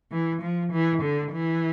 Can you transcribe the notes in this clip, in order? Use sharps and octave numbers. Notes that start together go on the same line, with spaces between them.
E3
F3
E3
D3
E3